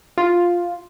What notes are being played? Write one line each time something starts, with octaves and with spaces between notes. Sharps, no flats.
F4